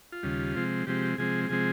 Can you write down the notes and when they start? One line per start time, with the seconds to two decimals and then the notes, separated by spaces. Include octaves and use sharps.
0.12 F4
0.23 D#2 C#3 G3
0.55 C3 F3 G#3 C4
0.87 C3 F3 G#3 C4 G4
1.18 C3 F3 G#3 C4 G#4
1.49 C3 F3 G#3 C4 G#4